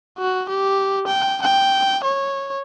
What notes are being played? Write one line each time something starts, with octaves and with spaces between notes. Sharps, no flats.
F#4
G4
G5
G5
C#5